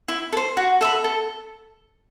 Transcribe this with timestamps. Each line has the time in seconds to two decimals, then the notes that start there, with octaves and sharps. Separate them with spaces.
0.08 E4
0.33 A4
0.37 C5
0.57 F#4
0.81 A4 E5 B5
1.04 A4